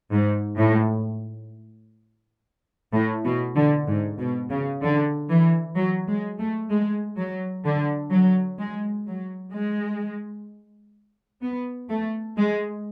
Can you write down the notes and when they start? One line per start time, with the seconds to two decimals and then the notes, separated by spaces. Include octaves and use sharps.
0.11 G#2
0.58 A2
2.93 A2
3.25 B2
3.57 D3
3.88 G#2
4.19 B2
4.50 C#3
4.83 D3
5.29 E3
5.76 F#3
6.09 G#3
6.40 A3
6.70 G#3
7.18 F#3
7.65 D3
8.12 F#3
8.59 G#3
9.07 F#3
9.53 G#3
11.43 B3
11.90 A3
12.37 G#3